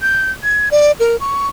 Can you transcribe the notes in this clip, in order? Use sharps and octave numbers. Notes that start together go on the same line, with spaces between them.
G6
G#6
D5
A#4
C#6